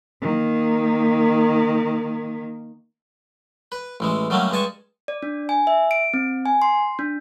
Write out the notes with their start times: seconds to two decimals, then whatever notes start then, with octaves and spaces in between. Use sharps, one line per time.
0.22 D#3 A#3
3.72 B4
4.00 A1 E3 G#3
4.30 D3 F#3 G3 A3 A#3 C#4
4.51 G2 G#3 G#5 A5 C#6
5.08 D5
5.22 D4
5.49 G#5
5.67 E5
5.91 D7
6.14 C4
6.46 G#5
6.62 C6
6.99 D4